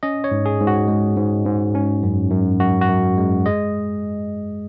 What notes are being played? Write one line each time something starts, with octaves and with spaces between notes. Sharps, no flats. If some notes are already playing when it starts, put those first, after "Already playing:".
C#4 D#5
C#5
G#2
G#4
G#2
F#4
G#3
G#2
G#2
C#4
F#2
F#2
F#2 F#4
F#4
F#2
G#3
G#3 D#5